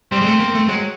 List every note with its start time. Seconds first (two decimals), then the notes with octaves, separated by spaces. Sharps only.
0.12 G3 C4
0.21 G#3
0.26 A3
0.40 A#3
0.55 A3
0.69 F#3 G#3